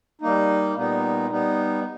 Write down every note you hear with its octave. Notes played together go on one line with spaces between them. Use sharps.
G3 A#3 D#4
A#2 G3 B3 D#4
G3 B3 D#4